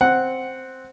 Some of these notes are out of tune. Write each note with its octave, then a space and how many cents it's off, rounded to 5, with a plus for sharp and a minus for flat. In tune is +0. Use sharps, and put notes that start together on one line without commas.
C4 +0 F#5 +0